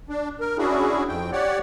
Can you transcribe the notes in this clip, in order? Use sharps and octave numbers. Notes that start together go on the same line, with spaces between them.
D4
A#4
C#4 D4 E4 F#4 G#4
F2 C4 G5
G4 C#5 D5 F#5